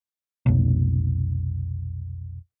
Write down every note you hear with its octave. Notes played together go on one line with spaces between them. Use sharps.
F1 B1